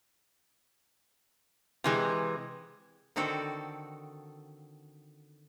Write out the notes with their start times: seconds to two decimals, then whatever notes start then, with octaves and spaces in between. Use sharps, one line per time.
1.84 C3 E3 G#3
3.16 D3 D#3 C4 F#4 A4